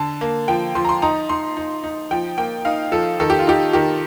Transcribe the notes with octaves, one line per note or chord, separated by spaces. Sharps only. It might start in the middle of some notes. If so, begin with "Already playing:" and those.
Already playing: D3 A5
A#3
F3 G5
F3 C6
A#5
C6
D#4 A#5
D#4 C6
D#4
D#4
F3 G5
A#3 G5
D#4 F5
F3 A4
D#3 A4
G4
F4
D#4 G4
D#3 G4